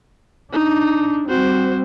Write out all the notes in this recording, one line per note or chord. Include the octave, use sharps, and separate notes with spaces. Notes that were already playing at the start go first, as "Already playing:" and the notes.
D4 D#4
G3 C4 F#4 C5